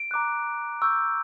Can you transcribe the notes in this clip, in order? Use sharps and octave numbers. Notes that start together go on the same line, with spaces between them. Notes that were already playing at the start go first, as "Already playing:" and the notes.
Already playing: D7
A#5 D6 F#6
C#6 E6 G6